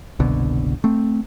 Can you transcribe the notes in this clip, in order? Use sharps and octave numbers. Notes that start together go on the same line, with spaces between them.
F#1 C2 B2 D3
A3 C4